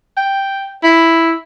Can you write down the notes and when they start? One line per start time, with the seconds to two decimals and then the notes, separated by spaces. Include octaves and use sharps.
0.17 G5
0.84 E4